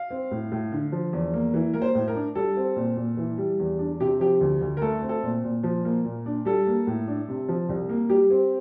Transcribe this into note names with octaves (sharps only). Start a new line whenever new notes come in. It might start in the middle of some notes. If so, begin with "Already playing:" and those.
Already playing: F5
C4
A2
A2
D3
F3
E2
A#3
E3
A#3 A#4
C5
A2
A#4
D4
G3 A4
C4
A#2
A#2
E3
G3
E2
D4
C3 G4
F3 G4
D2
D2
A#4
A3 A4
C4
A4
A#2
A#2
F3
A#3
A#2
D4
G3 A4
A#3
A2
D4
C3
F3
C2
A#3
G3 G4
C4